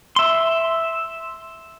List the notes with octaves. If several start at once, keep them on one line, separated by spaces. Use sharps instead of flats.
E5 C6